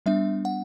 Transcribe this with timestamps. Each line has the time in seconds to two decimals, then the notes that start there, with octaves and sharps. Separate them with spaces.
0.06 G3 B3 D4 E5
0.45 F#5